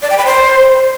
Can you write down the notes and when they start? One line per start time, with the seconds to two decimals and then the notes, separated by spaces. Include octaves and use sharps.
0.02 D5
0.10 G5
0.18 B5
0.26 C5